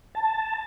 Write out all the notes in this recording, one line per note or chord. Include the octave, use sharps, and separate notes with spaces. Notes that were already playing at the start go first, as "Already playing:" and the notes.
A5